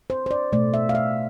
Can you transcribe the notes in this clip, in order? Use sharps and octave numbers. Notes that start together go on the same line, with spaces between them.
C5
C5
D5
B2 A3 D5
E5
F5
E5